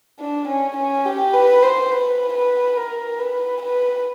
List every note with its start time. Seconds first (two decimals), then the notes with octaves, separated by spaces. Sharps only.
0.20 D4
0.48 C#4
0.77 C#4
1.05 G4
1.34 B4
1.62 C5
1.91 B4
2.33 B4
2.77 A#4
3.19 B4
3.62 B4